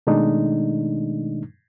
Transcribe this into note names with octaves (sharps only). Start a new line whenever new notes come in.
B2 D#3 G#3 A3 D4 D#4